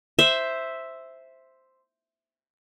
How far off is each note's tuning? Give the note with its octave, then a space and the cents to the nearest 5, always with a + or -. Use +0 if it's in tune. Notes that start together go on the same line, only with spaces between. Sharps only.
C5 +0 E5 +0